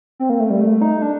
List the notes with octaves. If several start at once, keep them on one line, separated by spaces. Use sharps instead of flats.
C4
A#3
A3
G3
A3
D#4
D4